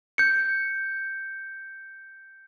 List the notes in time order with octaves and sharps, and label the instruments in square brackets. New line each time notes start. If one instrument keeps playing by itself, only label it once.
[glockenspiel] G6 C#7